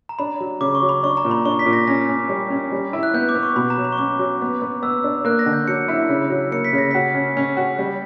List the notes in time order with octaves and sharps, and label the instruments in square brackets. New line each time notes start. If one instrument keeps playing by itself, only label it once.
[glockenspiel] A#5
[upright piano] D4 [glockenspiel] B5
[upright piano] F#3
[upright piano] C#3 [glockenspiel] D6
[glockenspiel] C#6
[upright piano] F#3
[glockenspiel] B5
[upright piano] D4 [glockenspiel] C#6
[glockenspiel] A#5
[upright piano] A#2
[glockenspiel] B5
[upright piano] D4 [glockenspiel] C#6
[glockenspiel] B6
[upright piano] A#2
[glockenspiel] A#6
[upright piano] C#4 [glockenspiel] A#6
[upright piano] C#4
G3
C#4
G3
E4
[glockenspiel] F#6
[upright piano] B3 [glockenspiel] G6
[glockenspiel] D6
[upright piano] B3
[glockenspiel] C#6
[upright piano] B2 [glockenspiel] B5
[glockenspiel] A#5
[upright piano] F#3
[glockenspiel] B5
C#6
[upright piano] C#4 [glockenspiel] D6
[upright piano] F#3
B3
B3
[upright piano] B3 [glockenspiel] E6
[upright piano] D4
[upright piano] A#3 [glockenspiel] F#6
[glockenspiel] A#6
[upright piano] D3
[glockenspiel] G6
[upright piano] F#3 [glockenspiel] C#7
[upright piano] E4
C#3
F#3
[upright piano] A#3 [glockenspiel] C#7
[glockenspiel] B6
[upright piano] C#3
[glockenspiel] A#6
[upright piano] F#4 [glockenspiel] B6
[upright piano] C#4
C#4
F#4
G3